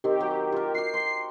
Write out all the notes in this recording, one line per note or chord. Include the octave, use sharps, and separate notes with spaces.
D#3 C4 G4
F#3
F4 A#4
F#4 G4 C7
C6